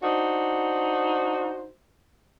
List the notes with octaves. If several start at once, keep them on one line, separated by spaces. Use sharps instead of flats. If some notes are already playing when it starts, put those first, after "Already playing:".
D4 D#4 F#4 C5